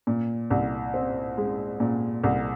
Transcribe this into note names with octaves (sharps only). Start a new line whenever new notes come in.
A#2
C2
C4
G#3
A#2
C2